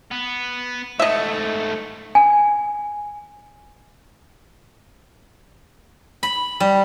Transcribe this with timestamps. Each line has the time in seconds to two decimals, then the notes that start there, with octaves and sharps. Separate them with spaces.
0.11 B3
1.00 G#2 A3 D#5 E5
2.15 G#5
6.23 B5
6.60 G3